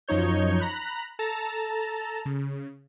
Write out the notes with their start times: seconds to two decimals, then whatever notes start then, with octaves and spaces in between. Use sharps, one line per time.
0.08 F#2 F3 D#4 C#5 G6
0.60 A#5 B5 F#6
1.19 A4 A5 A#5
2.26 C#3